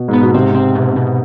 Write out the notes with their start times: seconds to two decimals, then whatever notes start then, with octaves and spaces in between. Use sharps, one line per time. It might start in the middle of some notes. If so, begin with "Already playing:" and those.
Already playing: B2
0.08 G#2
0.13 B3
0.22 B2
0.34 G#2 C3 C4
0.55 C4
0.75 B2
0.96 B2